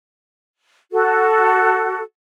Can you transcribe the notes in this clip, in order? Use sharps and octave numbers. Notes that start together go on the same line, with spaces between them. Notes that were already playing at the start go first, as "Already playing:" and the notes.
F#4 A4